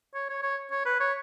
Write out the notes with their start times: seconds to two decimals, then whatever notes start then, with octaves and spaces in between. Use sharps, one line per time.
0.14 C#5
0.29 C#5
0.43 C#5
0.71 C#5
0.86 B4
1.00 C#5